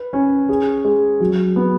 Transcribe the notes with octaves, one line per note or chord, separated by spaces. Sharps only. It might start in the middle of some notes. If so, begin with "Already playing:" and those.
Already playing: B4
C#4
G#4
G#3
F#3
B3